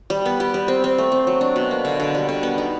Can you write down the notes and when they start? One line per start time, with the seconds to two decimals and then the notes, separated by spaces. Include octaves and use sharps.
0.10 G3
0.25 B3
0.40 G4
0.54 G3
0.68 C4
0.84 C4
0.98 A3
1.12 C4
1.27 F#3
1.41 D4
1.56 B2
1.71 A#3
1.85 D3
2.00 D3
2.15 G3
2.29 D3
2.43 B3
2.58 D#4